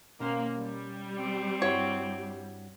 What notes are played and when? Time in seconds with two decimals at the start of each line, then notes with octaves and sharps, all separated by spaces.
0.20 B2 A#3 C#4 C5
0.57 G3
1.17 C4
1.62 G2 E4 F#4 C#5